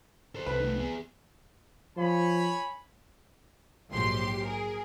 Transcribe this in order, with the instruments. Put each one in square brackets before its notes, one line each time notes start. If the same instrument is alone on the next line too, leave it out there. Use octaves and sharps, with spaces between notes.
[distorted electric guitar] A4 C5
[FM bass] C2 [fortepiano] B4
[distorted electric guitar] A3 D#4
B3 G#4
[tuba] F3 [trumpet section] C#5 G#5 B5
[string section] A#1 G#2 F#3 G4 C6
G#4 A#4